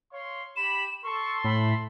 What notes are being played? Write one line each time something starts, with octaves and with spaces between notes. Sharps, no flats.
C#5 F5 C6
G4 B5 E7
A4 C6 C#6
A2 B5